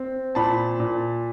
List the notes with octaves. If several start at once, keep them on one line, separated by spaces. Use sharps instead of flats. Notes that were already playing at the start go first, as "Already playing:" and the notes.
Already playing: C4
A#2 A5 B5
A#2